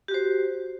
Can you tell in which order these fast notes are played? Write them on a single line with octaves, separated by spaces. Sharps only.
G4 F#4 C5